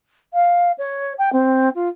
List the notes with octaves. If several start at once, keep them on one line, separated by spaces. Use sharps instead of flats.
F5
C#5
G5
C4
F4